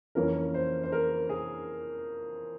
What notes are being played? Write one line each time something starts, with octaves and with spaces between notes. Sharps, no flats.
F2 E3 A#3 C#4 A#4
C5
C5
A#4
G#4